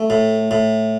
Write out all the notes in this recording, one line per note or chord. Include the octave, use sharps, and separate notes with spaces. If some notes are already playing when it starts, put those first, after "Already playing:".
Already playing: A3
A2
A2